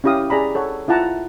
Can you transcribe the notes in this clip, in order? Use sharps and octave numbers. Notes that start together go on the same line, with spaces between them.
C#4 E4 G4 F5 D#6
G#4 D5 A#5 B5
A4 C#5 F#5
E4 F4 F#5 A5 A#5